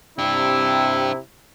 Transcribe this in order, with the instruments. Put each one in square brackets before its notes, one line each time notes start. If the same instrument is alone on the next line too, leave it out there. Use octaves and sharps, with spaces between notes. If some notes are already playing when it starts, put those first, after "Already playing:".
[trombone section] C3 [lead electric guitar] D4 G4 [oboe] E4